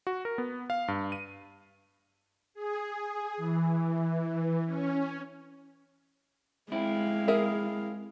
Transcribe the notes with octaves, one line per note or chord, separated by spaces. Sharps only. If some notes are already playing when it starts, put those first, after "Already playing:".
F#4
A#4
B3
F5
G2
D#7
G#4
E3
C#4
G#3 C4 E4 F5
G#4 A#4 E5